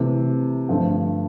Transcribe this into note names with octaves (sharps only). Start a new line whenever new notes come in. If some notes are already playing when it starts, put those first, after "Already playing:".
Already playing: C3 E3 A3
G2 D3 F3 A3